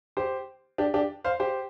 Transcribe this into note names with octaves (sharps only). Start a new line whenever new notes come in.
G4 C5
D4 G4
D4 G4
C5 F5
G4 C5